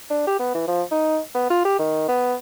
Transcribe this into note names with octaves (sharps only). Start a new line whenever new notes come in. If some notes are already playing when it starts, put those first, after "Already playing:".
D4
G4
B3
E3
F3
D#4
B3
F4
G4
D#3
B3